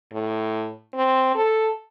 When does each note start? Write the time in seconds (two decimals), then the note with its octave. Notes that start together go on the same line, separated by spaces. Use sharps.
0.13 A2
0.95 C4
1.35 A4